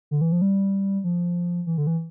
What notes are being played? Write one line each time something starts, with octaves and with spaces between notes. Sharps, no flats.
D3
E3
F3
G3
F3
E3
D3
E3